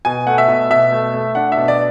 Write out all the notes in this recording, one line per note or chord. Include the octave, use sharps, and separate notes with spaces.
B2 G#5
A3 F#5
E5
B2
B2 E5
A3
A3
D4 F#5
E5
B2
D5